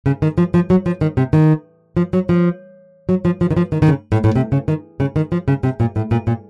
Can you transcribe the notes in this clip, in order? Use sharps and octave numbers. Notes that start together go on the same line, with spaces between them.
C#3
D#3
F3
F3
F#3
F3
D#3
C3
D#3
F3
F#3
F3
F#3
F3
F3
D#3
F3
D#3
D#3
C#3
A2
A2
C3
C#3
D#3
C#3
D#3
F3
C#3
C3
A#2
A2
A#2
A#2